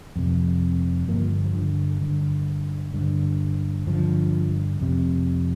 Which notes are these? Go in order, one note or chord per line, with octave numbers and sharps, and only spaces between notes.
F2 C3
G2 D3 F3 A#3
F3
D3
G2 D3
G2 D3
G2 D3 F3
F2 C3